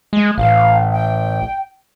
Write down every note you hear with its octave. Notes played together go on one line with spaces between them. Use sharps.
G#3
A1 F5
G5